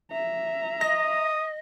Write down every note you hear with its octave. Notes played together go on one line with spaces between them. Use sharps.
E5 A#5
D#5 D#6 A#6